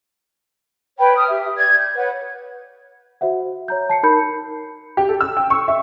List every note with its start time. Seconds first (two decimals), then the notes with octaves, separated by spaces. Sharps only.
0.98 B4 C#5 G5 B5
1.15 A5 D#6 F6
1.28 G4 E5
1.56 D5 G#6
1.77 G6
1.95 B4 C#5 F#5
3.21 F#4 C5 E5 F#5
3.68 C#5 A#5 G6
3.90 A5 C7 C#7
4.03 D#4 A#4 B5 G6 C#7
4.97 G4
5.09 A4
5.21 E6
5.37 G5
5.50 C#6
5.68 E5